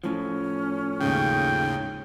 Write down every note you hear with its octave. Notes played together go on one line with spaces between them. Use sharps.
A2 F3 C#4
D#2 G#2 C#3 G5